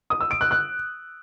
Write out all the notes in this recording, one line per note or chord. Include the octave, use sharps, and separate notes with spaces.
D#6
E6
D7
F#6
F#6